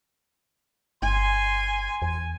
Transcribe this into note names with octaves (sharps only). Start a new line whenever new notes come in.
G1 G#5 C6
E2 G#5